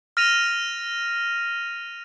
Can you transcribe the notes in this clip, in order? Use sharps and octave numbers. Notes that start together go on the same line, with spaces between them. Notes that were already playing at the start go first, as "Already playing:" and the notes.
F6 A#6 D#7 F7